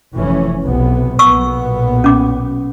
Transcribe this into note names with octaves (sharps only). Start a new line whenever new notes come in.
F1 E3 C#4
B1 C3 B3
B1 A#2 B3 C#6 E6
C#4 D6